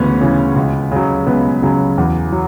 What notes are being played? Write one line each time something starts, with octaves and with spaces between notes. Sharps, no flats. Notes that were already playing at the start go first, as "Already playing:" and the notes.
Already playing: D2 C#3 E3 B3 C#4
C#3 E3
C#2
C#3 F#3
C#2 B3
C#3 F#3
E2
F#3